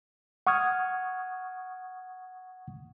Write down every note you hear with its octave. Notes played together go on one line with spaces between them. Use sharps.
F#5 C#6 D#6 F6 G#6